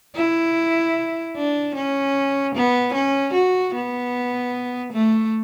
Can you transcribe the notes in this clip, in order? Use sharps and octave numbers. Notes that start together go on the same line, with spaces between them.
E4
D4
C#4
B3
C#4
F#4
B3
A3